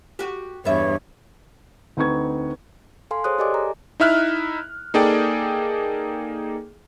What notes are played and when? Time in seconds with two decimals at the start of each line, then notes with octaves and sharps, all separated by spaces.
0.19 F#4 G4
0.65 E2 G2 B3 C#5 E5
1.97 D2 C4 D#4 B4 C#6 G#6
3.11 A4 F5 G#5 C6
3.24 G#4 C5 C#5 C6 D#6 F#6
3.39 G4 A4 D5 D#5 G#5 D6
3.54 A#5
4.00 D#4 E4 E5 F6 F#6
4.94 A#3 D#4 G#4 A4 D5 G5